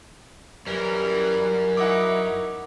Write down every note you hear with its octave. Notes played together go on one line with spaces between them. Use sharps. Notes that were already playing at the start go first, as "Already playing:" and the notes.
F#2 E3 G3 C#4 A#4
F#3 D#4 E4 F#5 D6